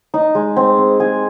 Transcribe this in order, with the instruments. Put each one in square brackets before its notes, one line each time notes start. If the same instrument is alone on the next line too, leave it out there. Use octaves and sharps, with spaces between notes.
[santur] D#4
G#3
C4
C4
G#4